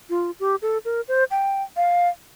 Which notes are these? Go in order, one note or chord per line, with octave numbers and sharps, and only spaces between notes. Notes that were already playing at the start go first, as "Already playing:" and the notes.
F4
G4
A4
A#4
C5
G5
F5